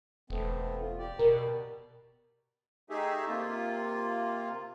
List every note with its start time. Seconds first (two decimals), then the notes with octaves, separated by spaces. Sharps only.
0.30 E1 A3 B3 C4
0.81 F4
0.98 G4 D5
1.19 B2 A#4
2.90 A3 D#4 G4 G#4 E5
3.27 C3 A#3 F4